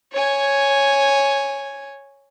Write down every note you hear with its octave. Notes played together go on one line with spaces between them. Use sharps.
C#5 G#5